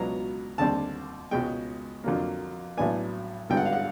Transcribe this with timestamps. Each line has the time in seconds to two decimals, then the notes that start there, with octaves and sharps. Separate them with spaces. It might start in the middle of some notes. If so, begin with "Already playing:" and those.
Already playing: C#2 B2 F#3 B3 D4 A#5
0.58 D#2 D3 G3 C4 A5
1.31 C#2 B2 G#3 G5
2.04 F2 D3 F#3 A#3
2.77 B1 A2 F#3 B3 D4 G#5
3.49 G#1 G2 D3 G3 B3 G5
3.57 F#5
3.65 F5
3.73 F#5